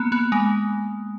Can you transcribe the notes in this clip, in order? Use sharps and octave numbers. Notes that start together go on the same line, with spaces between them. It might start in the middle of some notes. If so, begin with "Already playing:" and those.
Already playing: A#3 B3
B3
G#3